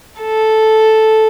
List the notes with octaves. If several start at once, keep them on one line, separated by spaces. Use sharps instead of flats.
A4